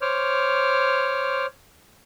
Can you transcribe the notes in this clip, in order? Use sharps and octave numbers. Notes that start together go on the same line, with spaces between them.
C5 C#5 D6 F6